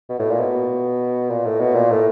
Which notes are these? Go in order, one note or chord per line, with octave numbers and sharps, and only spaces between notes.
B2
A2
A#2
B2
A#2
A2
B2
A#2
A2